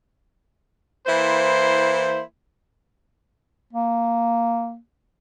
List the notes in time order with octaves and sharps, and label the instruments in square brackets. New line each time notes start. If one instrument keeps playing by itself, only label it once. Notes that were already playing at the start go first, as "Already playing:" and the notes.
[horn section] E3 A#3 E4 C5
[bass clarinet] A#3